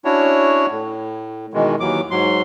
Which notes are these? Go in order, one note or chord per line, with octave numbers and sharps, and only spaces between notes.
C#4 D4 E4 F#4 C#5
A2
B2 D#3 E3 G#3
D#2 E3 F#3 D6
G#2 F#3 C6